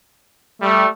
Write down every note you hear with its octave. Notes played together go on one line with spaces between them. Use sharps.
G3 A3